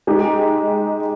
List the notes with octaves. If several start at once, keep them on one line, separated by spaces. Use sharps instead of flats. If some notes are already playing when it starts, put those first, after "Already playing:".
G#3 D#4 G4